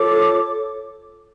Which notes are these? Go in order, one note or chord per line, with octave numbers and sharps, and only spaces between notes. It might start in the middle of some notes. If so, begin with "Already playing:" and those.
Already playing: F4 A4 C#5 D6